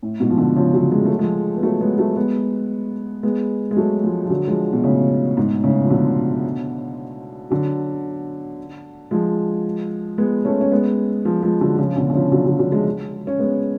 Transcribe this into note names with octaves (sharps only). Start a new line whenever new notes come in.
A2
G#2 B2
F3
B2 D3
C#3 F3
D3 F#3
G#3
A3
F3 G#3
B3
F#3 A3
G#3 B3
F#3 A3
G#3 B3
G#3 B3
G#3
F#3 A3
F3 G#3
F3
D3 F#3
F3 G#3
B2
A2 C#3
G#2 B2
A2 C#3
F3
B2 D3
D3 F#3
F3 G#3
G#3 B3
A3 C#4
C#4
G#3 B3
F3 G#3
F3 G#3
D3 F#3
C#3 F3
B2 D3
D3
C#3 F3
D3 F#3
D3 F#3
D3 F#3
F3 G#3
C#4
G#3 B3